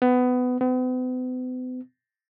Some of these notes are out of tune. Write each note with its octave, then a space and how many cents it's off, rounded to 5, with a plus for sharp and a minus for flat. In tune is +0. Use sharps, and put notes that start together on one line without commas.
B3 +20
B3 +45